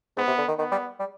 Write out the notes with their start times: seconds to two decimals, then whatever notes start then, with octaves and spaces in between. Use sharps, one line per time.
0.17 G#2 B3
0.27 C3
0.38 D3
0.48 D#3
0.59 D#3 B3
0.72 G3
1.00 G3